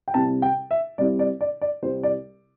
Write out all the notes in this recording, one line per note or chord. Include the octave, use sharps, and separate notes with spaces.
G5
C2 C3 G3 C4 E4 A5
G5
E5
C2 C3 G3 C4 E4 D5
D5
D5
D5
C2 C3 G3 C4 E4 C5
D5